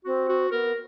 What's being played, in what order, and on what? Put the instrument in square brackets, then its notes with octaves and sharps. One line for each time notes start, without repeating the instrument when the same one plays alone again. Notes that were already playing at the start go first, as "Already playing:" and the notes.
[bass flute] C4 [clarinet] F#4
[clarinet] F#4
[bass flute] B3 [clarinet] A#4